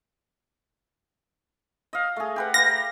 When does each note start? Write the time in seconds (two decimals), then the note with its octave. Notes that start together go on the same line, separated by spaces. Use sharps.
1.93 D#5 F5
2.16 A3 G#4
2.36 G4 B4 F#5
2.54 G4 B4 F5 A#6
2.66 A#5